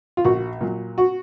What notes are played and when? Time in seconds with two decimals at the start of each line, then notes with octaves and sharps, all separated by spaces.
0.17 F4
0.24 A#1 F#4
0.61 A#2 F#3
0.98 F#4